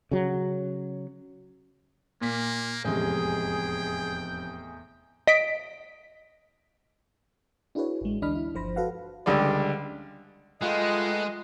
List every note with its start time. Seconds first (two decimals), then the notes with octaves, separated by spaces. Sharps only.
0.11 C#3 F#3
2.21 A#2 A#3 B6
2.85 F1 E2 A2 G#3 C#4 G#4 G5
5.27 D#5 B6 D7
7.75 D4 E4 F#4 G#4 B4 C#5
8.01 A1 G#3
8.22 D2 E3 D4 D#5 B5 F6
8.35 E4
8.55 G1 F3 C5 B5 A#6
8.76 F#4 A4 B4 F5 F#5
9.26 C#2 D3 G3 D4 D5
10.61 G#3 A3 F4 B4 D#5 F#5 G5